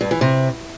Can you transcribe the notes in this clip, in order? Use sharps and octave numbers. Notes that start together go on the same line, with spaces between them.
G2
E3
C3